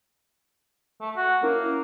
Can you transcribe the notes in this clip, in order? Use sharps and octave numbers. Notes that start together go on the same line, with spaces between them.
A3
F#4
A#3 C#4 E4 A#4